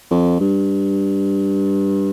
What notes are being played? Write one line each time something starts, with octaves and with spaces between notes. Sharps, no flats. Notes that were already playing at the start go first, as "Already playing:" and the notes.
F2
G2